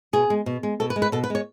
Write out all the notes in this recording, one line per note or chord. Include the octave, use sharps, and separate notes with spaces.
B2 G#4
G#3
B2
G#3
B2 A4
B4
G#3
B4
B2 A4
B4
G#3 C#5